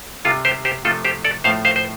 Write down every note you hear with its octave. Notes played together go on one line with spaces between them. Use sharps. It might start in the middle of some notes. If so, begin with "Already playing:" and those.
C3 G3 F4 A4
G4 C5
G4 C5
C3 F3 A3 F4 A4
G4 C5
A4 D5
A2 F3 A3 C5 F5
C5 F5
C5